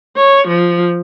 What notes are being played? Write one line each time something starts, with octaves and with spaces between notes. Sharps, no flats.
C#5
F3